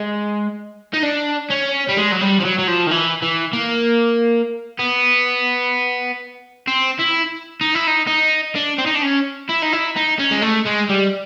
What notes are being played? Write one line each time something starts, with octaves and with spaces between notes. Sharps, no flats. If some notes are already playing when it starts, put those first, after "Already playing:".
Already playing: G#3
D#4
D4
C#4
G3
G#3
F#3
G3
F3
F#3
F#3
F3
D#3
E3
E3
A#3
B3
C4
E4
D#4
E4
D#4
D#4
D4
C4
D#4
D4
C#4
E4
D#4
E4
D#4
C#4
G#3
A3
G#3
G3